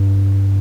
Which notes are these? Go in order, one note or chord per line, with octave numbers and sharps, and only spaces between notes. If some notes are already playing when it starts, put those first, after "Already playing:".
Already playing: G2